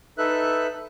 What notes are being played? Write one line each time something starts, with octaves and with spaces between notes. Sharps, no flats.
D#4 A4 B4 E5 F#6